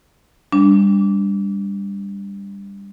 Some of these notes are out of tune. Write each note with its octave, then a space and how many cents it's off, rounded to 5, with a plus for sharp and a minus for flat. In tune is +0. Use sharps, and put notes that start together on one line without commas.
G3 +25 D4 -15